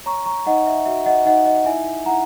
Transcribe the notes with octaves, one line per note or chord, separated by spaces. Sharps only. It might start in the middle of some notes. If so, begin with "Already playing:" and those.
C#5 A#5 C#6
A#5 C#6
D#4 D#5 F#5
E5
F#4 E5
D#5 F#5
D#4 D#5 F#5
D#5
E4 E5 G#5
E4 F#5 A#5